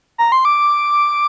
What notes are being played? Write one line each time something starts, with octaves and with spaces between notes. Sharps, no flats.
A#5
C6
D6